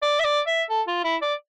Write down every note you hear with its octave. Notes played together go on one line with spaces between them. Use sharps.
D5
E5
D5
E5
A4
F4
E4
D5